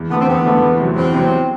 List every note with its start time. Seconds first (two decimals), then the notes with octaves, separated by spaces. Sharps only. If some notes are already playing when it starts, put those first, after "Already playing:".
Already playing: E2
0.10 D3 A3 B3
0.19 C4
0.28 E2 B3
0.45 D3 A3
0.62 E2
0.80 C3 F#3
0.96 E2 C4
1.14 C3 F#3